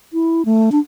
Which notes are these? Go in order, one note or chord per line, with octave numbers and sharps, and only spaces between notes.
E4
A3
D4